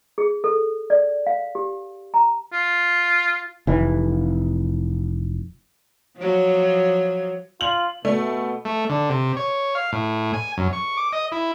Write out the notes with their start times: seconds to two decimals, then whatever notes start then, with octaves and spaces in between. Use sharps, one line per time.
0.18 G#4
0.44 A4
0.90 D5
1.27 F5
1.55 G4
2.14 A#5
2.52 F4
3.67 F1 E3
6.17 F3 F#3
7.61 F4 F#7
8.05 B2 A3
8.65 A3
8.89 D3
9.09 C3
9.37 C#5
9.75 F5
9.92 A2
10.33 G#5
10.57 F#2
10.73 C#6
10.97 D6
11.13 D#5
11.32 E4